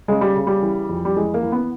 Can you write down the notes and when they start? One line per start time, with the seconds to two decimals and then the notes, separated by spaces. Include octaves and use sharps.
0.08 C#3 G#3
0.21 G3
0.36 C#3
0.47 G3
0.63 E3
0.89 F2
1.05 G3
1.16 E3 G#3
1.34 A#3
1.43 E3
1.52 B3